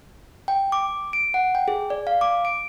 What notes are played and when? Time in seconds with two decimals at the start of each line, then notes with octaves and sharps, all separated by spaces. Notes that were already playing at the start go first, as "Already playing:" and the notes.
0.48 G5
0.72 D6
1.13 D7
1.34 F#5
1.55 G5
1.68 G#4
1.90 D5
2.07 F5
2.21 D6
2.45 D7